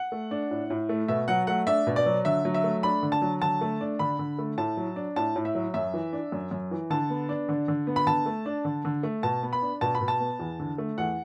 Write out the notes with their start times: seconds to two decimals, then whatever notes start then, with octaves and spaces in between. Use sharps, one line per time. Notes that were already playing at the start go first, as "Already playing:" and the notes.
Already playing: F#5
0.12 A3
0.31 D4
0.51 A2
0.70 A2
0.89 A3
1.08 B2 E5
1.28 F#3 F#5
1.47 A3 F#5
1.67 D4 E5
1.87 B2
1.96 D5
2.06 F#3
2.25 D3 E5
2.45 F#3
2.54 E5
2.64 A3
2.83 D4 B5
3.03 D3
3.12 A5
3.22 F#3
3.42 D3 A5
3.61 A3
3.81 D4
3.99 D3 B5
4.19 D3
4.38 A3
4.58 A2 A5
4.77 F#3
4.96 D4
5.16 A2 A5
5.36 A2
5.45 E5
5.55 F#3
5.74 F#2 E5
5.94 E3
6.13 D4
6.32 F#2
6.51 F#2
6.71 E3
6.90 D3 A5
7.10 B3
7.29 D4
7.49 D3
7.68 D3
7.87 B3
7.96 B5
8.07 D3 A5
8.26 A3
8.46 D4
8.65 D3
8.85 D3
9.03 A3
9.23 B2 A5
9.43 B3
9.53 B5
9.62 D4
9.81 B2 A5
9.95 B5
10.01 B2
10.08 A5
10.20 B3
10.40 E2
10.59 D3
10.78 A3
10.98 E2 F#5